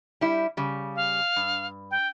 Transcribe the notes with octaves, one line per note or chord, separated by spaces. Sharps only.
G3 E4
C#3 G3
F5
G2
G5